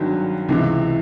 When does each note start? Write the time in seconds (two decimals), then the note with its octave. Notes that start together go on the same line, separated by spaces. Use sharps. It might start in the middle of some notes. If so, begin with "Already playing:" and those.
Already playing: G#1 G2 D#3 F#3
0.49 C#2 C3 E3